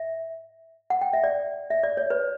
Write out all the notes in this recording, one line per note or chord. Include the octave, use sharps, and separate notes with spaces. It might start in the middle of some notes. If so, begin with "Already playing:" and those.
Already playing: E5
F#5
G5
E5
D5
E5
D5
C#5
B4